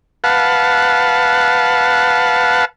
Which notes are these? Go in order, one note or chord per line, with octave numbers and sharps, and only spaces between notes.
B4 F5 F#5 A5